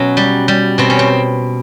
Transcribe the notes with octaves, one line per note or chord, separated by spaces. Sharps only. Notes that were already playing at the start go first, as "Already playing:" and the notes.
Already playing: B2 F#3 C#4
G3
G3
B2 C4
C#4
C4